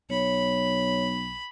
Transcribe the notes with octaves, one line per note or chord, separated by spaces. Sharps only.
B1 C#5 B5